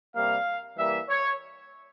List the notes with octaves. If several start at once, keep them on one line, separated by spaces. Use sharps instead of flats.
C3 G3 A#3 F5
E3 G3 A#3 E5
C#5